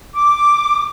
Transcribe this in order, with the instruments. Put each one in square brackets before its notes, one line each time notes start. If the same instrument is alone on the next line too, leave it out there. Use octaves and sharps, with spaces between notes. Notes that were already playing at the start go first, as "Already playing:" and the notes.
[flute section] D6